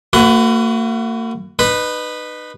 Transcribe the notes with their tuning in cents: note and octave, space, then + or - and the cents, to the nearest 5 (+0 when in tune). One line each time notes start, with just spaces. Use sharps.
A#3 -45 F#4 +0 B4 +30
D#4 -30 B4 +0